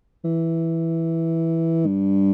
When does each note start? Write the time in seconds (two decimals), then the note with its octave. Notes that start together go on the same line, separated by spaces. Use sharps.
0.24 E3
1.86 G2